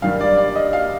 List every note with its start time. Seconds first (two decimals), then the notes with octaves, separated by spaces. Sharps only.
0.02 G2 D#3 G3 F5
0.21 D5
0.38 D5
0.56 D#5
0.73 F5